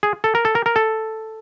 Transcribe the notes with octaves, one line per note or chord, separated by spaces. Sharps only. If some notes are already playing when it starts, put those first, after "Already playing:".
G#4
A4
A#4
A4
A#4
A#4
A4